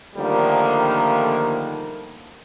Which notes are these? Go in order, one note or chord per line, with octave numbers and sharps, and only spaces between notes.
D3 D#3 F3 G3 A3 A#3